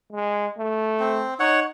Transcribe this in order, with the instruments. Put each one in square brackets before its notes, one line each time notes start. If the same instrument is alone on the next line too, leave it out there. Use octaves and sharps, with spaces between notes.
[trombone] G#3
A3
[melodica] C4
[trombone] D#4 [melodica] C#5 F#5